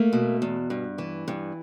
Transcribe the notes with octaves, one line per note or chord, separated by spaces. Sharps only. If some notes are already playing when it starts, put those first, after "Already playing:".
Already playing: A3 A#3
B2
E2
G2
E3
G2